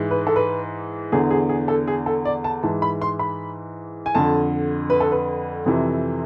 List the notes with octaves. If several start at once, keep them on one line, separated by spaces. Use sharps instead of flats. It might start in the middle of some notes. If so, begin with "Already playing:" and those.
Already playing: G#2 E3
B4
A4
B4
E2 D3 G#4
G#4
G#4
A4
G#4
A4
D5
A5
G#2 E3 A5
B5
C6
B5
G#5
F2 D3 A5
B4
A4
B4
F2 C3 E3